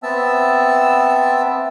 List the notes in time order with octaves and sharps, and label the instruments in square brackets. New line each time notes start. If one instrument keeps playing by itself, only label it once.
[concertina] B3 C4 E5 A5 E6